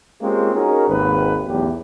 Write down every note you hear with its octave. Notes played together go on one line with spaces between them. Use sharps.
G#3 A#3 C4 C#4 F4 G4
C#4 D#4 F#4 G#4 A#4
G#1 D#2 B4
B1 E2 A2 F#3 A3 G4